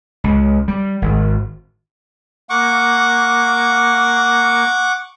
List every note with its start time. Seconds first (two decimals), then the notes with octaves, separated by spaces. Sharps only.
0.24 C#2
0.68 G3
1.02 G#1
2.50 A#3 F#5 C#6 D6